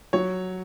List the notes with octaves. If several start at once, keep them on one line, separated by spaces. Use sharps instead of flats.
F#3 C#5